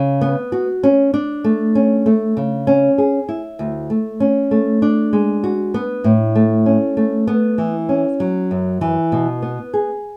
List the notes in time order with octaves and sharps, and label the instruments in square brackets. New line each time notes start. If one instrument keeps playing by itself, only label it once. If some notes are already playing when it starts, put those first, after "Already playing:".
Already playing: [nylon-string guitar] C#3
B3
F#4
C#4
D4
A3
C#4
A3
C#3
C#4
G#4
E4
D2
A3
C#4
A3
D4
G#3
F#4
B3
A2
A3
C#4
A3
B3
E3
C#4
F#3
F#2
E3
B2
B3
G#4